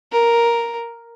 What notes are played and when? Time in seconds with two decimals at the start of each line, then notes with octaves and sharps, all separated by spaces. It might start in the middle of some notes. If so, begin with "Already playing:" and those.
0.12 A#4